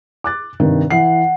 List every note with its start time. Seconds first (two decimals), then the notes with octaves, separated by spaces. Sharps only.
0.24 D6 F#6 A6
0.60 G2 C3 D#3
0.91 E3 F#5 C7